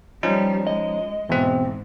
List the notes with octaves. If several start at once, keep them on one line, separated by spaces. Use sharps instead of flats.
F3 G3 C#4 D#4
G#3 D#5
E2 G#2 B2 C4